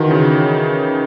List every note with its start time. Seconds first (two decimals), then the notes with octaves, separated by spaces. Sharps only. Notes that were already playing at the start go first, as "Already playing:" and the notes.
Already playing: D#3 E3 D#4 F#4 F#5
0.11 C#3